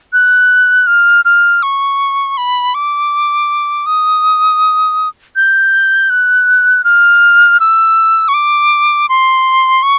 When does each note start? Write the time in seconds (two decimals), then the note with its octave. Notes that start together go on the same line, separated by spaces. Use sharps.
0.13 F#6
0.87 F6
1.25 F6
1.63 C#6
2.37 B5
2.74 D6
3.86 D#6
5.36 G6
6.10 F#6
6.84 F6
7.60 E6
8.28 C#6
8.34 D6
9.09 C6
9.83 C#6